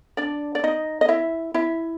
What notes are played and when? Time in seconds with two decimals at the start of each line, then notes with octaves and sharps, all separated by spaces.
0.17 D4 D5
0.55 D5
0.64 D#4 D#5
1.01 D#5
1.08 E4 E5
1.54 E4 E5